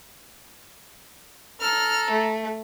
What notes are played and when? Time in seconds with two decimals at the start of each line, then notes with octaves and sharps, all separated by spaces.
1.60 A4 A#5 F6
2.11 A3